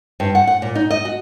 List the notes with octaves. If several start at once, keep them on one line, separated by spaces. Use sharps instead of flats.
G2
F#5
F#5
A#2
D#4
D#5
F#4